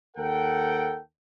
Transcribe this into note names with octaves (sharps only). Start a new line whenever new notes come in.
D#2 A4 A#4 F#5 G5